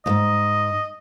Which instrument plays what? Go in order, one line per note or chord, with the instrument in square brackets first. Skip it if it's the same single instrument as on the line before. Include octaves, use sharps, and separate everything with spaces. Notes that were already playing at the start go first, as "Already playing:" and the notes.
[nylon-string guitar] D#2 G#2 [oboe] D#5